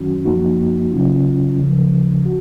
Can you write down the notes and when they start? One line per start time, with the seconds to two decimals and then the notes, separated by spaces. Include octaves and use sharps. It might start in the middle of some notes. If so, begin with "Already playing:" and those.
Already playing: F#2 D#3 F#3 C#4 F#4
0.25 F#2 F3 A#3 D#4 F#4
0.92 C#3 F#3 C#4 F4
1.58 D#2 C#3 F3
2.25 F#4